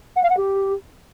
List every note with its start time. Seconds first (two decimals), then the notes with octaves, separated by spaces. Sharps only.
0.16 F#5
0.23 F5
0.30 F#5
0.37 G4